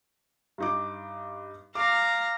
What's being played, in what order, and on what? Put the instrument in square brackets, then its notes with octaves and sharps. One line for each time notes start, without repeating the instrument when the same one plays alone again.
[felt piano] G2 D#4 D6
[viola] F5 A#5 [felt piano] D6